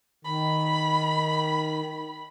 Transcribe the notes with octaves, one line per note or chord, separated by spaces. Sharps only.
D#3 B5